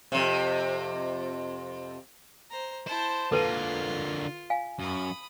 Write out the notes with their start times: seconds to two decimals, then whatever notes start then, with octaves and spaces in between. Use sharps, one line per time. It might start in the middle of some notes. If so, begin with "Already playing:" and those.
0.12 F2 C3
2.50 C5 A#5
2.86 E4 C5 A5
3.32 D3 A#3 F4 A4 B4 A5
4.50 F5 G#5
4.79 F#2 B5 D#6